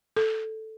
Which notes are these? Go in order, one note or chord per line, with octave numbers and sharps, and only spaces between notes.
A4